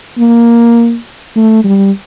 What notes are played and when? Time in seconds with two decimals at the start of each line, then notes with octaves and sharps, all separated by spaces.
0.18 A#3
1.36 A3
1.64 G3